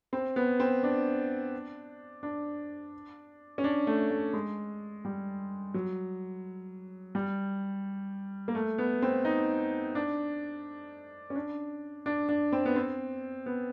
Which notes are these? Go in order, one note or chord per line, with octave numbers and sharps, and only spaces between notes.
C4
B3
C4
D4
D4
C#4
D4
A3
A3
G#3
G3
F#3
G3
A#3
A3
B3
C4
D#4
D4
C#4
D4
D4
D4
C4
B3
C4
B3